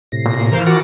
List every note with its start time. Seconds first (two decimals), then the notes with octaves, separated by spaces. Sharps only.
0.12 A2 C3 A#6 C7
0.26 A#2
0.51 E3 A#4 C5 F5
0.66 F4 F#4 A#4 F#5 D6